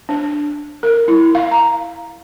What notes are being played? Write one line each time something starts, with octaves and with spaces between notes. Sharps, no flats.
D4
A#4
E4
F5
A#5